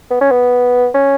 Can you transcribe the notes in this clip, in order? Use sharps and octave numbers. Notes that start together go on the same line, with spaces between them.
B3
C#4
B3
C#4